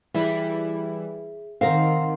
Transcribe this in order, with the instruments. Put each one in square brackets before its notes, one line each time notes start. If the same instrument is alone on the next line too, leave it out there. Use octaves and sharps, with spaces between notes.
[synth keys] E3 G3 E4 [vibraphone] G#4 [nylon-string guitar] E5
[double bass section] D#3 [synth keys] C4 [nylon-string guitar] A#4 F5 [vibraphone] F#5 C6